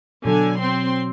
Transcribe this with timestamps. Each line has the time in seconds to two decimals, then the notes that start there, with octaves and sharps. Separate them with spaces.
0.25 B2 D3 F#3 G#5
0.58 C4 C6